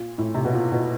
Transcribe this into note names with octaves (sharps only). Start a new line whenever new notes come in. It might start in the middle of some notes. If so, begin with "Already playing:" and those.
Already playing: A#2
A2
C3
B2
A#2
B2